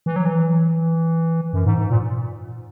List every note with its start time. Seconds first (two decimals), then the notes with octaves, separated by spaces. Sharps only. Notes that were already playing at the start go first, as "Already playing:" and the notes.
0.06 E3
0.16 F#3
0.25 E3
1.53 F#2
1.65 G#2
1.78 G#2
1.90 A#2